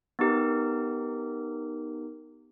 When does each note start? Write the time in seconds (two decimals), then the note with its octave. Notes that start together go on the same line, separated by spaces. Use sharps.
0.19 B3 D#4 G4 A#4